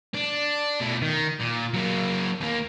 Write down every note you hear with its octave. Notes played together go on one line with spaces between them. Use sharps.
D4
B2 A3
D#3
A#2
F#3 A#3
D#2 A#3